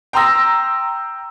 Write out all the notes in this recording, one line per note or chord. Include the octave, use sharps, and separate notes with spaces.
G5 A#5 C6 D#6 E6 A#6